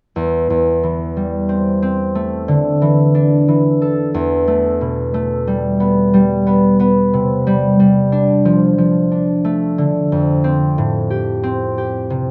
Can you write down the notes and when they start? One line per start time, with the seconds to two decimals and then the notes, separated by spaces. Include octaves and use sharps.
0.16 E2
0.50 E2
0.83 E3
1.17 G3
1.49 C4
1.82 C4
2.15 A3
2.48 D3
2.82 E3
3.15 D4
3.48 E3
3.82 A4
4.14 E2
4.48 A3
4.81 B2
5.14 A3
5.47 G3
5.80 B3
6.14 G3
6.47 B3
6.80 B3
7.14 C3
7.47 G3
7.80 G3
8.12 D4
8.45 F3
8.78 F3
9.11 D4
9.45 A3
9.78 D3
10.12 F2
10.44 C4
10.78 A2
11.10 G4
11.43 C4
11.78 G4
12.10 C3